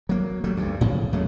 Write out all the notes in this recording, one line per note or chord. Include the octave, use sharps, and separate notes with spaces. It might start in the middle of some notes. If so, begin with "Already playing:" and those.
F#3 A#3
F#3 G3 A3
D2 G2
A2 C#3 F3
D#2 F#3 G#3 A3